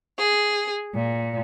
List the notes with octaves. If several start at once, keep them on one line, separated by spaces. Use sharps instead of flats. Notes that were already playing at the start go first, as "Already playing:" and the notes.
G#4
A#2